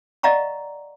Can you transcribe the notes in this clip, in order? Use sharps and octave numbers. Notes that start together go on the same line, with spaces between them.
D5 D#5 F5 F#5 A#5 C#6